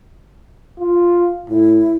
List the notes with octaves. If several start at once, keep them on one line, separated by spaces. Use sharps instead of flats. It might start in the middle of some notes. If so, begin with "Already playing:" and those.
F4
A2 E4